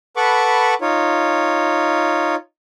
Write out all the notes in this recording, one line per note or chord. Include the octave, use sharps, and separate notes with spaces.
A4 B4 F#5 B5 C#6 D6
D#4 F4 C#5